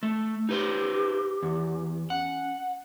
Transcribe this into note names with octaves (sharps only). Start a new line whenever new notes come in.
A3
D#4 G4 B4 C5
E2
C#4 F#5